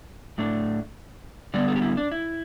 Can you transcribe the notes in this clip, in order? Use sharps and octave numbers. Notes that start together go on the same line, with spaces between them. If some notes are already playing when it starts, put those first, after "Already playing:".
A2 A3 D4
D3 G3 B3 D5
A4
G4
E4
D4
E4